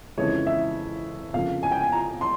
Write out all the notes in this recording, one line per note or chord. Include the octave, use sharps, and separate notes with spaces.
F2 C#3 E3 G#3 C#5
E5
F2 C#3 F3 A#3 F5
G#5
G5
G#5
A#5
C6